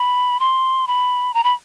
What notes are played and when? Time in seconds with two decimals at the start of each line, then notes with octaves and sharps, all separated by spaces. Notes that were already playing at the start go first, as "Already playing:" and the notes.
Already playing: B5
0.40 C6
0.87 B5
1.34 A#5
1.44 B5